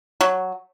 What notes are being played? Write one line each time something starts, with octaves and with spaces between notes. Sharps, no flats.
F#3